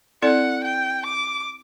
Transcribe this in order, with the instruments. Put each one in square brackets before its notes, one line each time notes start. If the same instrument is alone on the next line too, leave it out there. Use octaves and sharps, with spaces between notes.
[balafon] C4 E4 A4 D5 [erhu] F#5
[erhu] G5
D6